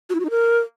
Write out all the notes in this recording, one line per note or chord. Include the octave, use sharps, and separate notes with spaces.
F#4
E4
F#4
D#4
A#4